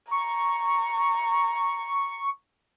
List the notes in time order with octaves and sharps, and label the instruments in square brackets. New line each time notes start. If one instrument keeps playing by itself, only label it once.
[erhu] A#5 [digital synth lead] C#6